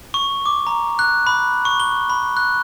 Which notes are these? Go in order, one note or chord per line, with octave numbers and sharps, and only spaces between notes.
C#6
D6
A#5
F#6
B5
C#6
G7
B5
F#6